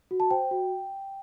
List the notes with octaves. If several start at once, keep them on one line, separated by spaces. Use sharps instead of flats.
F#4
A5
C5 G5
F#4